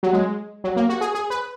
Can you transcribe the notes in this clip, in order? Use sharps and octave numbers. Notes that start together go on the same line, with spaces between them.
F#3
G#3
F#3
A#3
F#4
G#4
G#4
B4